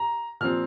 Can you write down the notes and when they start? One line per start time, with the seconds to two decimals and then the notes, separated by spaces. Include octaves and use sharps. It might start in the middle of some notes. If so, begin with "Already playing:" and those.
Already playing: A#5
0.41 A#2 F3 C4 F6